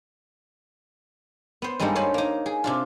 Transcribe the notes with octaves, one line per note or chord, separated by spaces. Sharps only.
B3 C5
G2 G3 G#3 A#3 D#4 A4
C5 C#5 G#5 A5 B5
A#3 D#4
G#4
C3 D4 F4